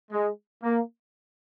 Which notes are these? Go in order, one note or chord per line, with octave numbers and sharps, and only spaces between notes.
G#3
A#3